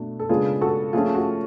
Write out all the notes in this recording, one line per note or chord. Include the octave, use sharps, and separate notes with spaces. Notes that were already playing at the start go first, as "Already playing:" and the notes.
Already playing: B2 A3 D4
A4
C#3 G#3 B3 D4 F4 G#4
F#4 A4
F3 A3 C#4 F4 G#4
F#4